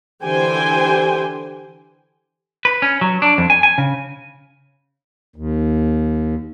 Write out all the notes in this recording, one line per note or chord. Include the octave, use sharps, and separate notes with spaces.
D3 E3 G4 C5 G5 G#5
B4
C#4
F#3
D4
F2
G#5
G#5
C#3
D#2